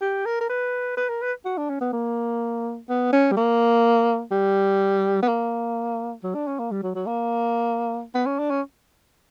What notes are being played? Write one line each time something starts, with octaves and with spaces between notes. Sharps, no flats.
G4
A#4
A#4
B4
B4
A#4
B4
F#4
D4
C#4
B3
A#3
B3
C#4
G3
A#3
G3
B3
A#3
F#3
D4
C#4
A#3
G3
F#3
F#3
A#3
B3
C#4
D4
C#4